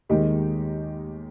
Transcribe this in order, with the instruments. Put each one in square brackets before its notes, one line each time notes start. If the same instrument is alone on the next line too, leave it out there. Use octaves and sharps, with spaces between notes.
[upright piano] D#2 D#3 G#3 D#4 G4